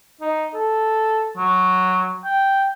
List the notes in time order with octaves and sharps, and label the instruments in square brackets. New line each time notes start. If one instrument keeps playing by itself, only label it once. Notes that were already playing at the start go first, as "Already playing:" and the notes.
[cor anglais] D#4
A4
F#3
G5